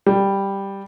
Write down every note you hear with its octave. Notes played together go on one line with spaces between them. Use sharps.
G3